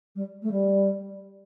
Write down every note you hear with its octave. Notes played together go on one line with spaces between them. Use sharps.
G3
A3
G3